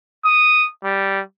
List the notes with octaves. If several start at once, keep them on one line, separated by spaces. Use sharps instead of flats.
D#6
G3